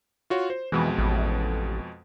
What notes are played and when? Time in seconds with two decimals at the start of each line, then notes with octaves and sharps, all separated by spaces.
0.30 F4 F#4 C#5
0.50 C5
0.72 F2 B2 E3 G#3
0.98 A1